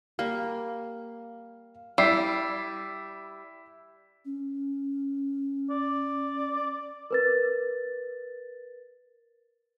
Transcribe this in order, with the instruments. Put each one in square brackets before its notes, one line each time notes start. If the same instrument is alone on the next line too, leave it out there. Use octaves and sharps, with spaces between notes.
[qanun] G3 A#3 [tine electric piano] F5
[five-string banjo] G3 [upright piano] E4 E5 C7
[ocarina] C#4
[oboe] D5
[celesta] A#4 B4 A6